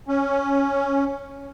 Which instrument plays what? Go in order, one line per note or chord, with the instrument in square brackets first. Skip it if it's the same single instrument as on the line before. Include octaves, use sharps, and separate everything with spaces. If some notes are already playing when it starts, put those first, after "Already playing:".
[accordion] C#4